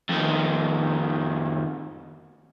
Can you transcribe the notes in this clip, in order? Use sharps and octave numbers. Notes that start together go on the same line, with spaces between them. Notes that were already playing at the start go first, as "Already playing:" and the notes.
F2 D#3